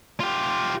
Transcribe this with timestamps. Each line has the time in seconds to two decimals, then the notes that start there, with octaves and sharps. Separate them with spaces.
0.20 F4 G4